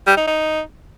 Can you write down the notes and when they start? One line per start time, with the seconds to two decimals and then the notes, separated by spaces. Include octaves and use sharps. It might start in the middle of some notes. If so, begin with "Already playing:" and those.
0.07 G3
0.17 D#4
0.27 D#4